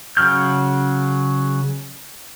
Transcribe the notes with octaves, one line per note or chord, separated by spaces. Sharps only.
C#3 F#3 F6 G6